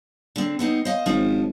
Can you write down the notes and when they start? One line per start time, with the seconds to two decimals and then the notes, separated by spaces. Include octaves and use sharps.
0.36 D3 C4
0.59 B3 C4 D#4
0.85 C5 D#5 F5
1.06 G#1 F3 C#4 C5